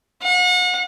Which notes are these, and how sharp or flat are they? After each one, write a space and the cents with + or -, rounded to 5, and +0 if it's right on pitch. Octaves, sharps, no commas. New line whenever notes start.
F#5 -40